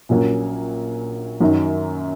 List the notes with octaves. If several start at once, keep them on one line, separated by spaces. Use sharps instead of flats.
A#1 A#2 F#3 A#3 C#4
F#2 D#3 F#3